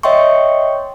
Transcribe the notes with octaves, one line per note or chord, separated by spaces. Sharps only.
C#5 D#5 E5 G5 C6 C#6